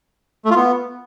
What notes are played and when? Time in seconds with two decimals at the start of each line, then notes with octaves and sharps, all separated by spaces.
0.45 A3
0.51 F4
0.56 B3